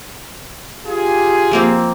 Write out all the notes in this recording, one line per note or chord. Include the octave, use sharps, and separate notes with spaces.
F4 G4 G#4
F3 A#3 C4